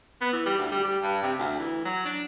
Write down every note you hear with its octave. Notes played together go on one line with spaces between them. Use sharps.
B3
E3
G3
D2
G3
G3
G2
C3
D2
E3
F#3
D4